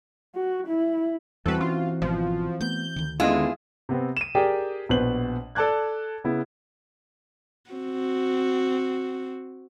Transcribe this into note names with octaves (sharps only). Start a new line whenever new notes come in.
F#4
E4
E2 E3 G3 C4 F#4 A4 B4
C#4 F4
G#1 B2 F3
A3 B3 G6
D2 D#3
D#2 D3 G#3 B3 C#4 E4 F4 G#4
C3 B3 C4
D#7 E7
G4 G#4 A#4 D5 G5
A#1 B2 B4 C5 F#7
A4 D5 A5 D6 F#6 G#6
C#3 B3 E4
C4 F#4